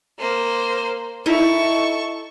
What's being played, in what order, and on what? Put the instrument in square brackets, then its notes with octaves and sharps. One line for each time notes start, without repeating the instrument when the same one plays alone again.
[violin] A#3 C5
[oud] D#4 E4 [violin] A4 C#6